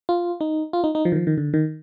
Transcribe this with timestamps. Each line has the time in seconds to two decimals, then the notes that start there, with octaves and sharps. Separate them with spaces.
0.09 F4
0.41 D#4
0.73 F4
0.84 D#4
0.95 D#4
1.05 F3
1.12 D#3
1.16 F3
1.27 D#3
1.38 D3
1.54 D#3